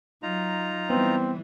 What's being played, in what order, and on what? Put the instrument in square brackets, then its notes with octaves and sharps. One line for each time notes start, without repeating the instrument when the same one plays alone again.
[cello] F#3 [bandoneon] D#4 F4 A#5
[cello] E3 G3 [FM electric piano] B3 [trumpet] C4